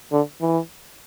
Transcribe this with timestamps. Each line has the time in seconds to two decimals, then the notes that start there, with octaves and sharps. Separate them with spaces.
0.12 D3
0.41 E3